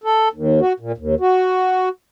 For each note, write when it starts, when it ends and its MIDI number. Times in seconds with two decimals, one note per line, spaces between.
0.04 0.28 69
0.33 0.60 39
0.61 0.73 66
0.80 0.92 46
0.98 1.15 39
1.20 1.89 66